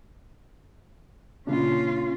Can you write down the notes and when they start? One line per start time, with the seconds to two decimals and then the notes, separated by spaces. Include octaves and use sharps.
1.47 A#2 C#3 C#4 D4 F4